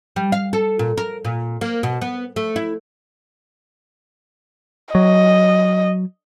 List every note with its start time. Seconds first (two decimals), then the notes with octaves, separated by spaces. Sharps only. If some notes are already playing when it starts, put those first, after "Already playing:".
0.16 G3
0.32 F5
0.53 A4
0.79 A#2
0.97 A#4
1.25 A#2
1.61 A#3
1.83 B2
2.01 B3
2.36 A3
2.56 E4
4.95 F#3 D#5